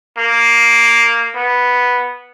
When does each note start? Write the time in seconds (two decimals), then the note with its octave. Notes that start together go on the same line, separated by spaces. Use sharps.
0.18 A#3
1.35 B3